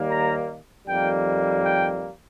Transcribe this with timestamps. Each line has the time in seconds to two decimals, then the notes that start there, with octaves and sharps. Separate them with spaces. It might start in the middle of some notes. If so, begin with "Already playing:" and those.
Already playing: D#2 D#3 G3 A#3
0.11 A#5
0.86 F2 D#3 G3 A#3 G5
1.64 G5